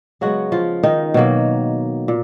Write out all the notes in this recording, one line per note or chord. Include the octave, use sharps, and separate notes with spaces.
C#3 F#3 G#3 B3 F#4
F3 F4
D#3 D#4
B2 F#3 A#3
A#2